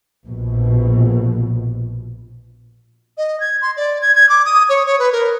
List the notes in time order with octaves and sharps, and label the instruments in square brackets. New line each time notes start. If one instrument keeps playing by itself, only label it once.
[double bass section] A#1 B2
[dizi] D#5
G#6
C6
D5
G#6
G#6
D6
D#6
C#5
C#5
B4
A#4